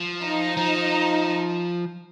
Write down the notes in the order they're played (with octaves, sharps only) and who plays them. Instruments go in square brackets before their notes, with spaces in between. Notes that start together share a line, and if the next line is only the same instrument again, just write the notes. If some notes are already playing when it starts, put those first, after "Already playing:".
Already playing: [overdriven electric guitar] F3
[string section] D#4
[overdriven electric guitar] F3